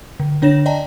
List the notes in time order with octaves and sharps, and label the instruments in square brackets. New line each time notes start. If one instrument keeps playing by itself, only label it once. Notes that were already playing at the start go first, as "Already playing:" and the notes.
[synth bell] D3
D3 D4 C#5 A#6 E7
D5 D#5 G5 A5 A#5